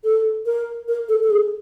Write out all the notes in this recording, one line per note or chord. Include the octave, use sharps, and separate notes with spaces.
A4
A#4
A#4
A4
A4
G#4